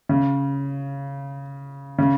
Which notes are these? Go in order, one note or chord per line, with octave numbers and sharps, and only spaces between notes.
C#3
C#3